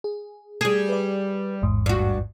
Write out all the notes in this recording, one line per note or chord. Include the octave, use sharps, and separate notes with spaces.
G#4
G3 G#4 G#6
B4 D5
A1 E2 G#2
G2 F#4